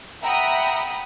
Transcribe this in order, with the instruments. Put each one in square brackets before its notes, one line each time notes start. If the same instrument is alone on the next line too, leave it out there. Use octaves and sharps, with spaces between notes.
[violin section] E5 F#5 G5 A#5 B5 D#6